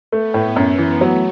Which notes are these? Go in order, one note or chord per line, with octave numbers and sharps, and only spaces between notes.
A3 B3
A2
F#2 B3
E3
F#3 A3